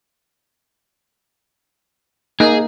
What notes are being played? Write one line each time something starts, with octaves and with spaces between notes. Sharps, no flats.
A#3 D#4 G#4